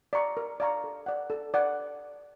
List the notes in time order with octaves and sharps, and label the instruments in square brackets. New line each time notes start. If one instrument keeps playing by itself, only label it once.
[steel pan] D5 F5 A#5 C#6
A#4
D5 F5 A#5 C#6
A4
D5 F#5
A4
D5 F#5